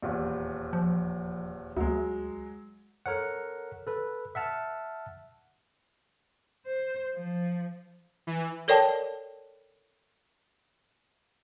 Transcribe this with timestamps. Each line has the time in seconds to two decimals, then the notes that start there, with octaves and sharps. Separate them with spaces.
0.02 D#1 E2
0.73 F3
1.77 D2 F#3 G#3
3.06 A4 A#4 C#5 F#5
3.87 A4 B4
4.35 E5 F#5 A5 F6
6.66 C5
7.15 F3
8.27 E3
8.68 A4 A#4 C#5 D5 G5 A5